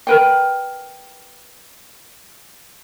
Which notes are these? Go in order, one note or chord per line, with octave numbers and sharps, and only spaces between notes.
A#4 B4 G5